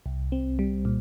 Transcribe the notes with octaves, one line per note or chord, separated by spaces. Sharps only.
C2
C4
G3
A#2